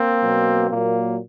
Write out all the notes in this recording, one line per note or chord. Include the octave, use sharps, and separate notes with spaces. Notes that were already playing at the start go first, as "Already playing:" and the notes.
Already playing: A#3 C4
B2 F#3
A#2 F#3 A#3